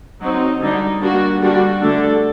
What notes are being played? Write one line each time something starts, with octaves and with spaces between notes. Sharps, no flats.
F#3 C4 D#4
D3 G3 D4 D#4
G3 A#3 D4 F#4
D3 G3 D4 F#4
D3 A3 D4 A4